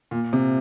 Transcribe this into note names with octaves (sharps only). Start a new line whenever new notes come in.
A#2
C3